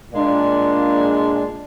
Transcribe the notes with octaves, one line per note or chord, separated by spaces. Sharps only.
A#2 G#3 D4